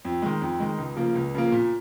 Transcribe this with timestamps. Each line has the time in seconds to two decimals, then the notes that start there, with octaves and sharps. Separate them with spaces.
0.05 F2
0.22 D#3 G#3
0.41 F2
0.60 D#3 G#3
0.78 C#2
0.96 C#3 F3 A#3
1.15 C#2
1.35 C#3 F3 A#3
1.52 A#2